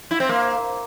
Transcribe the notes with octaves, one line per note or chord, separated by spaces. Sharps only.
E4
C4
A#3